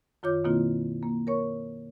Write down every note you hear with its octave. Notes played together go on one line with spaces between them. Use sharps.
F#2 D#3 F4 C#5 D6 G6
B2 D#3 A#3 C4 E4 F4
A#3
A#4 C#5 C#6